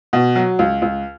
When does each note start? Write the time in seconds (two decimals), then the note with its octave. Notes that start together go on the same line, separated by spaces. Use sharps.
0.13 B2
0.36 F#3
0.59 C#2
0.82 C#2